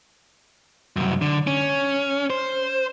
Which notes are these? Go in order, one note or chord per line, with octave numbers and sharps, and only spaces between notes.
C2 F#2
D3
C#4
C5